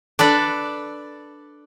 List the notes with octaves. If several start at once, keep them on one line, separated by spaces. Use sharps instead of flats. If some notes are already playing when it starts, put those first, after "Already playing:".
D4 A4 B4 D5